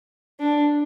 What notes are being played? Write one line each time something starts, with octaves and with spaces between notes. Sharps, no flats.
D4